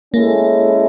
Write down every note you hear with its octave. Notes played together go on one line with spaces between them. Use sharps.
G#3 A#3 C#4 E4 A4